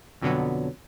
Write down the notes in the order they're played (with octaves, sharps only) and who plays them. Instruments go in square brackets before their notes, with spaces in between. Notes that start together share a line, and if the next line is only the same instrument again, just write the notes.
[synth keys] F2 B2 D3 F#3 B3